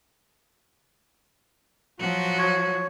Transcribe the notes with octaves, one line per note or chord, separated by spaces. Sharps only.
F3 F#3 F#4
C#5